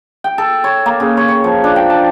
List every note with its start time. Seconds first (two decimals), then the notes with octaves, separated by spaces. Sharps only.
0.24 G5
0.38 A4
0.64 C#5
0.86 A#3
1.00 C#3
1.17 C#5
1.28 C#5
1.44 F3
1.64 D4
1.76 G5
1.90 A5